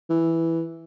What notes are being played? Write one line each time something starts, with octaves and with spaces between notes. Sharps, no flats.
E3